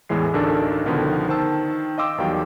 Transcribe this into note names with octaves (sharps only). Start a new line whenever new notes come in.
E2 A2 E3 G#3 C7
A1 D2 D4 D#4 A4 A#4
C#2 B2 D3 D#3 F3 B3
D#3 C5 G5 A5 E6
D#5 F5 G5 C6 D6 E6
E2 D#3 F#3 G3 F5 G5